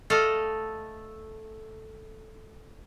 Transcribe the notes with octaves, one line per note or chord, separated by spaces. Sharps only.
A3 A4 D#5 F5